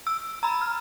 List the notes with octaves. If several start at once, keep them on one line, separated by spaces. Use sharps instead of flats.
E6
A#5 B5
F6